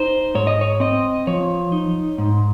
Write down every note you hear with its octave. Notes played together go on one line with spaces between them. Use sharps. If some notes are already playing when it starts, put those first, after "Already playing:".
Already playing: D#4 C5
G#2 C#5
D#5
C#5
C4 D#5
F3 C#5
D#4
G#2